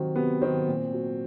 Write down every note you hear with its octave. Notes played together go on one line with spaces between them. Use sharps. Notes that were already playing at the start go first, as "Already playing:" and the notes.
Already playing: C3 D#3 F#3 C4
C3 B3
D#3 F#3 C4
A#2
F#3